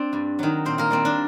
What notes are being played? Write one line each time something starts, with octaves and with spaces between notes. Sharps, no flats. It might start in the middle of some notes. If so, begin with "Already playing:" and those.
Already playing: C4 D4 D5
G2
D#3 F#3
A#2 C4 C5
A#3 A#4
G3 A#3 C4
D4